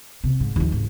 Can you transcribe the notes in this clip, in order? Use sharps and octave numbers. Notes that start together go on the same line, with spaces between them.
C3
G#2
D#2 F3
G#1